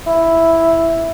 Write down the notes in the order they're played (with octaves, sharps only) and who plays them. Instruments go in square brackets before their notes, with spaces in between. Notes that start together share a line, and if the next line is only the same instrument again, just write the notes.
[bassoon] E4